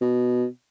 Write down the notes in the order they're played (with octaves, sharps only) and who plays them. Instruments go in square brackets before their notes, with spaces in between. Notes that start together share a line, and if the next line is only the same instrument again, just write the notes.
[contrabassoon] B2